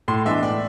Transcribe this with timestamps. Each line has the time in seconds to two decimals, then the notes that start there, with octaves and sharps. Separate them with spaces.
0.08 A2 C6
0.25 E3 G#3 B3 D4 E5
0.42 A2 D5